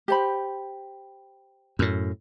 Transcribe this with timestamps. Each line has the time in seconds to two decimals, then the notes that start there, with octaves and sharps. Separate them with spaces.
0.08 G4 C5 B5
1.79 F#2 A2